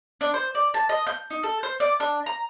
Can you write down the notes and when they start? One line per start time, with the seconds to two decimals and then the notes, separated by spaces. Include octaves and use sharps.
0.21 D4
0.34 C5
0.55 D5
0.74 A5
0.89 D#5
1.07 G6
1.30 D#4
1.43 A4
1.63 C5
1.80 D5
2.00 D4
2.26 A#5